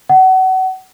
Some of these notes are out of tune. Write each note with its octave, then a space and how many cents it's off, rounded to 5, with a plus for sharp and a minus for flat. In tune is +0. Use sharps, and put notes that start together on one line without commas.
F#5 +30